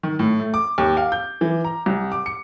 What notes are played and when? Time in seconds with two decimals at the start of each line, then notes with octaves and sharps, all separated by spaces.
0.03 D#3
0.19 A2
0.40 A3
0.54 D6
0.78 D#2
0.97 F5
1.12 G6
1.41 E3
1.64 A#5
1.86 C2
2.12 D6
2.26 C#7